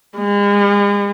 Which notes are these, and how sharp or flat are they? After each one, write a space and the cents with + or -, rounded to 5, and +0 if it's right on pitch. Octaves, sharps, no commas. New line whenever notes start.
G#3 -40